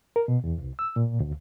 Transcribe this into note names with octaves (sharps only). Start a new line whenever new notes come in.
A#4
B2
E2
C2
E6
A#2
D2